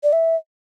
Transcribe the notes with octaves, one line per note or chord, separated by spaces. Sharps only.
D5
E5